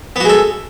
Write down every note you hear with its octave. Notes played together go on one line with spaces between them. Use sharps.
G#3 B3 F#4 A4